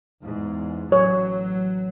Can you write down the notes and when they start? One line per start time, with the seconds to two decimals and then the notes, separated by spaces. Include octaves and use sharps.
0.23 E2 G#2
0.92 A1 F#3 C#5